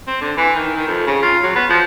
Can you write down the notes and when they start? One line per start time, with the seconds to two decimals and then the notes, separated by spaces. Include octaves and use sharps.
0.07 C4
0.21 D3
0.37 E3
0.55 D#3
0.76 D#3
0.88 F2
1.07 C#3
1.22 F4
1.43 F#3
1.55 B3
1.70 F3